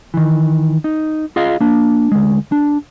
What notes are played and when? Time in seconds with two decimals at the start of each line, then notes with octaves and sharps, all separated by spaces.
0.14 D#3 E3
0.84 D#4
1.36 F4 G#4 D#5 F5
1.60 A#3 D4
2.12 D2 G#3
2.52 D4